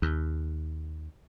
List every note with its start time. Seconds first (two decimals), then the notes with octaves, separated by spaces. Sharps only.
0.02 D#2